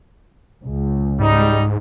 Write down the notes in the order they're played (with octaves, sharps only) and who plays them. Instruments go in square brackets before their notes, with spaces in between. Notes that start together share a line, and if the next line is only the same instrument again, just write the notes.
[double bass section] C#2
[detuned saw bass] G#2 [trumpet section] G3 D#4